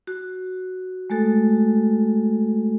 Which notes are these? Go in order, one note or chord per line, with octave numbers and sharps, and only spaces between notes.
F#4
G#3 A3 F#4 A4